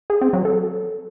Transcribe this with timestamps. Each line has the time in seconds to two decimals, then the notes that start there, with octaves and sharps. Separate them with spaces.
0.10 G#4
0.21 C4
0.33 F#3
0.45 A4